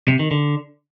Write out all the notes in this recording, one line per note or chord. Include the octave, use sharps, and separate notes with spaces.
C3
D#3
D3